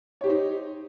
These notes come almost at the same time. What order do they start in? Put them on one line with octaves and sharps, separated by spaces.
C#5 G4 C5 D#4